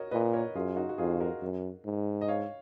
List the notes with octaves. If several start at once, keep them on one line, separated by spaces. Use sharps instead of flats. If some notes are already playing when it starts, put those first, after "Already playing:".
Already playing: F#4 A#4 C#5 D#5
A#2 B4 D#5
A#4 C#5
F#2 F4 G#4
D#4 F#4
F#4
F2 F4 G#4
F#4 A#4
F#2
G#2
D#5
C#5 F5